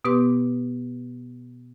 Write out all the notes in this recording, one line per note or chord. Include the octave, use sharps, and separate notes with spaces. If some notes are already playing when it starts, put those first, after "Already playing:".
B2 B3 G4 B4 C6 D6